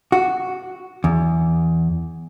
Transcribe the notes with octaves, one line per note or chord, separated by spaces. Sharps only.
F#4
E2